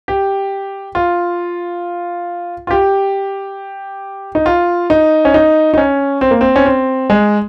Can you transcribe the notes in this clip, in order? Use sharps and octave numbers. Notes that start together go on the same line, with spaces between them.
G4
F4
F4
G4
D#4
F4
D#4
C#4
D#4
D#4
C#4
C4
A#3
C4
C#4
C4
G#3